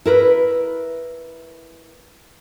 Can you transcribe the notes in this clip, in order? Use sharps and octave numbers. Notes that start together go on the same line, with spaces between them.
E4 A#4 B4